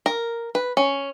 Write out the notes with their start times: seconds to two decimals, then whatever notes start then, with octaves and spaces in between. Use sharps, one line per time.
0.06 A#4
0.55 B4
0.77 C#4